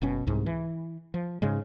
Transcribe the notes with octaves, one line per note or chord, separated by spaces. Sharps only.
F#1 B2 C#4
C2 G#2
E3
F3
G#2 C#3 G#3